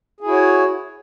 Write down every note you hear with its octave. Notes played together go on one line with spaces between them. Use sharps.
E4 F#4 G#4 C#5